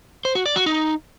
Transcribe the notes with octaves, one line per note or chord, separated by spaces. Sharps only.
C5
F#4
D5
F#4
D#4